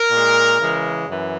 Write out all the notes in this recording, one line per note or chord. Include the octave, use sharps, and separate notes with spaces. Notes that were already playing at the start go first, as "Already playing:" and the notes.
Already playing: A#4
A#2 G#3
C#3 E3 G#3
F#2 E3